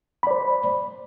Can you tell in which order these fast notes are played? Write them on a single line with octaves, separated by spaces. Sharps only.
B5 D5 C5